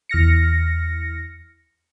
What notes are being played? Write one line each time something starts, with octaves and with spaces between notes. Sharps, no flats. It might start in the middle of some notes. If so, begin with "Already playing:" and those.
E2 F6 A#6 C#7